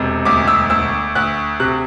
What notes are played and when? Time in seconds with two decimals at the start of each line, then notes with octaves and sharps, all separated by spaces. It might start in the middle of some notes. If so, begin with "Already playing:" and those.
Already playing: E1 C3
0.25 D2 D6
0.47 E6
0.70 D2 E6
1.15 D2 F#6
1.60 C3 F#6